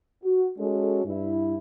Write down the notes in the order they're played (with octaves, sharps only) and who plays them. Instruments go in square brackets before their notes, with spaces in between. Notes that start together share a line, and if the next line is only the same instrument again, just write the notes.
[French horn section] F#4
G#3 C#4 F#4 A4
G2 E4